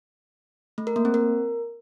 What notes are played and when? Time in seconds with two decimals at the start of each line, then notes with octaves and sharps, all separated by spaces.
0.78 A3
0.87 A#4
0.96 A#3
1.05 C4
1.14 A#4